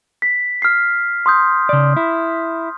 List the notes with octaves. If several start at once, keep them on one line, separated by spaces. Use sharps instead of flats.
B6
F6 C7
C6 D#6 G6
C#3 D5
E4